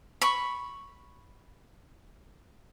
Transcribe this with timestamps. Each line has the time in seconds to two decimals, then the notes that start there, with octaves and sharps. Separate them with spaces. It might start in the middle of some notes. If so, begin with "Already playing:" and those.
0.22 B5 C#6